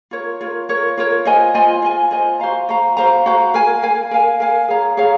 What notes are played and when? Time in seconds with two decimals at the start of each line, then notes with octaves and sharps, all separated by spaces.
0.11 F4 A#4 C#5
0.41 F4 A#4 C#5
0.69 F4 A#4 C#5
0.98 F4 A#4 C#5
1.25 F4 C5 D#5 G#5
1.54 F4 C5 D#5 G#5
1.82 F4 C5 D#5 G#5
2.11 F4 C5 D#5 G#5
2.40 F#4 C5 F5 A#5
2.69 F#4 C5 F5 A#5
2.97 F#4 C5 F5 A#5
3.26 F#4 C5 F5 A#5
3.54 A#4 F5 G#5
3.83 A#4 F5 G#5
4.11 A#4 F5 G#5
4.40 A#4 F5 G#5
4.68 G#4 C#5 F5 A#5
4.97 G#4 C#5 F5 A#5